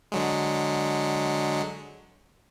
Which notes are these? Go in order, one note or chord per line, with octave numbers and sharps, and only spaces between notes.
D3 F#3 G#3